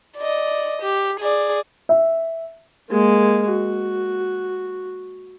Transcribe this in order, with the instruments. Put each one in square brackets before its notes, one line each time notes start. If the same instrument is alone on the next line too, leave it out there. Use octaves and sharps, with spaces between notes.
[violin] D5 D#5
G4
G#4 D5
[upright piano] E5
[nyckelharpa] G#3 A#3
F#4